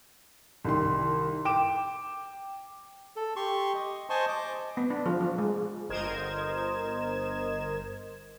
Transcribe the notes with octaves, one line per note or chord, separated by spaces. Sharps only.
C2 D#3 C6
G5 D6 D7 E7
A4
G4 C6 C#6
D#5
C5 D#5 G#5 A5 C6 C#6
D#5 D6
B3
D4
F3
F3
G#3
G1 A#4 C5 D#5 G#6 E7